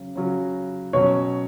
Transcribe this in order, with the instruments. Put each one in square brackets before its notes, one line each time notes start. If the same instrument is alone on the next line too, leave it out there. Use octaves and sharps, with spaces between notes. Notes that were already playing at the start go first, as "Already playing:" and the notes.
Already playing: [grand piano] C#3 F#3 C#4
C#3 F#3 C#4 F#4
[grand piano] B2 F#3 C#4 [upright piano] C#5